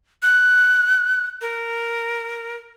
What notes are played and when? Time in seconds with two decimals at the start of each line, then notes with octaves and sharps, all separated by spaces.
0.23 F#6
1.41 A#4